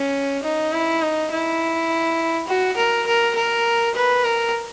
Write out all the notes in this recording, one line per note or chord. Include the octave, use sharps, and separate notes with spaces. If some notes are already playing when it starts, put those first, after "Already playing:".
Already playing: C#4
D#4
E4
D#4
E4
F#4
A#4
A#4
A#4
B4
A#4